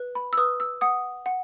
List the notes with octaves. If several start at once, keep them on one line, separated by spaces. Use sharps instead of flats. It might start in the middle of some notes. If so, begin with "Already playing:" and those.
Already playing: B4
B5
E6
B4 D#6
E6
F#5 D#6
F#5